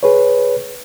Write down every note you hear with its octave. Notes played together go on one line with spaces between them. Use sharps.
G#4 B4 C#5